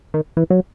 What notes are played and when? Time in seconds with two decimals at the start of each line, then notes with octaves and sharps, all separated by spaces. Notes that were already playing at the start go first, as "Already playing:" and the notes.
0.14 D#3
0.37 E3
0.50 F#3